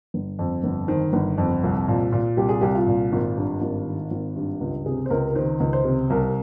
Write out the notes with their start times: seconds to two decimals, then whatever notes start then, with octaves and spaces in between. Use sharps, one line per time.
0.14 G1
0.39 F2
0.63 G1
0.88 D#3 C5
1.13 G1
1.38 F2
1.63 C2
1.88 A#2
2.12 A#2
2.37 C2 G4
2.49 G#4
2.61 C2 G4
2.75 F4
2.87 A#2
3.12 G#1
3.37 G2
3.62 G#1
3.86 D#3
4.11 G#1
4.36 G2
4.61 C#2
4.86 C3 G#4
5.06 C5
5.10 C#2 A#4
5.28 A#4
5.35 D#3 C5
5.60 C#2
5.73 C5
5.85 C3
6.10 C2 A#4